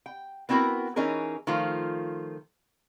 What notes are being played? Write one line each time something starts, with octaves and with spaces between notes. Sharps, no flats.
G5
B3 C4 E4 F#4 A#4
E3 C#4 D#4 G#4 A#4
D#3 F3 A3 F4